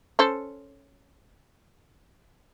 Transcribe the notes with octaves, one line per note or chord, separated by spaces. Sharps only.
C#4 A4 C5